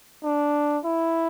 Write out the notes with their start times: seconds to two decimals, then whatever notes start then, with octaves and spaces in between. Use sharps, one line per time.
0.24 D4
0.85 E4